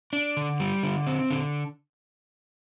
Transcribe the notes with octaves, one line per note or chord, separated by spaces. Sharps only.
D4
D3
G3
D3
C4
D3